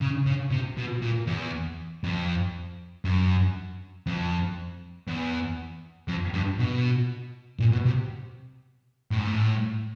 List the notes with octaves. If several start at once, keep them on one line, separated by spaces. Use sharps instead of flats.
C#3
C#3
C3
B2
A#2
E2
F2
F#2
F2
E2
F2
G2
B2
A#2
B2
C3
A2
G#2
A2